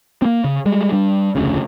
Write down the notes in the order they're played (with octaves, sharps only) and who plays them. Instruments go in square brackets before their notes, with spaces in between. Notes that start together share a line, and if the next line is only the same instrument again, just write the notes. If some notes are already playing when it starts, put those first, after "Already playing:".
[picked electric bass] A#3 C4
C#3
G3 G#3
G3 D4
F1 D2 C#3